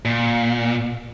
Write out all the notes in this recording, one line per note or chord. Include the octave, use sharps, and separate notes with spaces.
A#2